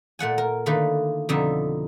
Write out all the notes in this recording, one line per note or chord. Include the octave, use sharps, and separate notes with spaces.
A#2 A3 F#5 G#5
A#4
D3 D#3 A3 A#3 B4
F2 B2 D3 D#4 E5